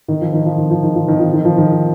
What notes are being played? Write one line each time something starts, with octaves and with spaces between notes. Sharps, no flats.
D#3
F3
D#3
F3
D#3
F3
D#3
F3
D#3
F3
D#3
F3
D#3